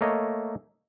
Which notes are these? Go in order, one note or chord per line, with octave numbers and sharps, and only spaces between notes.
A3 A#3 C#5 D#5